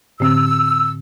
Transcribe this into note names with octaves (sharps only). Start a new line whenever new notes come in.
A2 D3 C4 E6